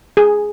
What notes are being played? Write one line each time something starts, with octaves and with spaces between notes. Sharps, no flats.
G#4